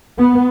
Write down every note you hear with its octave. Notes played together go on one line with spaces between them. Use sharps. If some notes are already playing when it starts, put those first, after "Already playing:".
B3